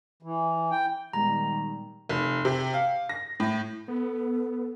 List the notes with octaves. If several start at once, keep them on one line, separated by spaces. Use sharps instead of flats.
E3
G5
A#2 D#3 G3 G#3 B3 A#5
F1
C3
F5
A#6
A2
B3 A4